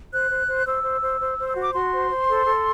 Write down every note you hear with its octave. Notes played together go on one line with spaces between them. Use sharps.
C5 F#6
C5
C5
C5 E6
C5
C5
C5
C5
E6
F#4
D6
F#4 C6
C5
C5
A4
A4